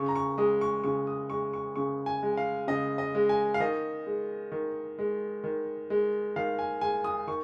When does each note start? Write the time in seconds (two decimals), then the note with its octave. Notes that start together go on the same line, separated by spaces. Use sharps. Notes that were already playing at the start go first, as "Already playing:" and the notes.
Already playing: C#3 C#6
0.08 A#5
0.15 C#6
0.38 G#3 D#6
0.61 C#6
0.84 C#3 C#6
1.07 D#6
1.30 G#3 C#6
1.53 C#6
1.76 C#3 C#6
2.06 G#5
2.23 G#3
2.37 F5
2.68 C#3 D#5
2.98 D#5
3.15 G#3
3.29 G#5
3.54 F5
3.60 D#3 D#5
4.06 G#3
4.52 D#3
4.98 G#3
5.44 D#3
5.90 G#3
6.36 D#3 F5
6.59 G#5
6.81 G#3 G#5
7.04 D#6
7.27 D#3 C#6